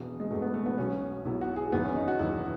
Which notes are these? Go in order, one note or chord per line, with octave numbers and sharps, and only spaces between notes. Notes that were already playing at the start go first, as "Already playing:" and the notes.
Already playing: E1 E2 B2
G#3
E1 E2 B2 A3
B3
A3
B3
B1 B2 F#3 C#4
B1 B2 F#3 E4
F#4
G#4
E1 E2 D#3 F#3 B3
C#4
D#4
F#4
E1 E2 D#3 F#3 E4